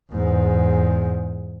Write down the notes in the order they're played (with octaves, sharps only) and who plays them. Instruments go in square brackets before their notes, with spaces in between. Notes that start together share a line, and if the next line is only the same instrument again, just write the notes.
[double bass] E2 G#2